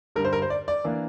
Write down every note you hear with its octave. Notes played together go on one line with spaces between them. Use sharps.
G2 D3 G3 A#4
C5
A#4
C5
D5
D5
E3 A#3 D4